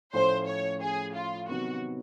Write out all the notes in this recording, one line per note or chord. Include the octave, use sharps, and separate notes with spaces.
A2 F3 A3 C#4 C5
C#5
G#4
F4
C3 D#3 F#3 B3 F#4